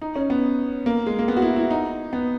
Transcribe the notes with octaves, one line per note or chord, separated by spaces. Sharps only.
D#4
C#4
B3
A#3
G#3
A#3
B3
F#4
E4
E4
D#4
B3